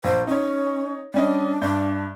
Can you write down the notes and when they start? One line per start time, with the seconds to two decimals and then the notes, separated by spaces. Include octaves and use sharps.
0.04 A#1 C5
0.27 C#4 D#4 C#5
1.14 G3 C#4 D4 D#5
1.61 G2 D4 E5 G6